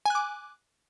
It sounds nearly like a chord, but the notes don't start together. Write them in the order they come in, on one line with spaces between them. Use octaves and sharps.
G#5 F#6 D6